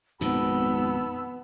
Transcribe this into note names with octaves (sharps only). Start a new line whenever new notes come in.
G#1 F2 A#2 D#3 B3 A5 B5 E6